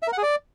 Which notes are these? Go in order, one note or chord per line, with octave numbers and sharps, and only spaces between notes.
E5
A#4
F#5
G#4
D5